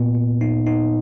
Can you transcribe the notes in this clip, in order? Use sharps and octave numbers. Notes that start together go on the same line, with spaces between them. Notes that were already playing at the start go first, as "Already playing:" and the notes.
Already playing: A#2 B3
A#2
D#4
D#4